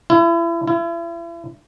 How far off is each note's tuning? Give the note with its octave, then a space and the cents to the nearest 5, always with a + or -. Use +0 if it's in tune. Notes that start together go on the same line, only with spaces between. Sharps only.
E4 +35
E4 +40